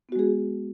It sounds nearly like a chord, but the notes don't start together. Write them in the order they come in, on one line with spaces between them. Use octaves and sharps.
B3 F#4 G#3 G#4